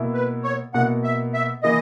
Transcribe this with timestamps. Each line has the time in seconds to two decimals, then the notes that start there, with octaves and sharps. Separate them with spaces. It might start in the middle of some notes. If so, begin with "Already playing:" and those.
Already playing: B2 A#3 E4
0.14 B4
0.44 C#5
0.74 B2 A#3 E4 F#5
1.04 E5
1.34 E5
1.63 E3 A#3 E4 D#5